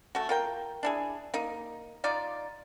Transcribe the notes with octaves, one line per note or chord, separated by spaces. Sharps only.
A3 F#4
F4 A#4 G5
D4 E4 G#4
A#3 D#4
D#4 F4 D5